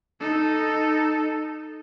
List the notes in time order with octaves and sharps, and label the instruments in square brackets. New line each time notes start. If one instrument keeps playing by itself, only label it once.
[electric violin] D#4 A4